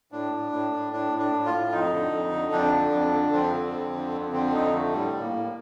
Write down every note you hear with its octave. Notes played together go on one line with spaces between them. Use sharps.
A2 D4
A2
A2
A2
A2 D4
A2
D4
A2
F4
A2
F2 D#4
D3
F2
D3
F2 D4
D3
F2
D3
F2 C4
D3
F2
D3
F2
D3 C4
F2 D#4
D3 A3
A2 G3
A2
A#3
A2